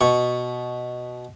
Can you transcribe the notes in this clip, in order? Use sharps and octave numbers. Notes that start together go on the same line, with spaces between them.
B2 C#6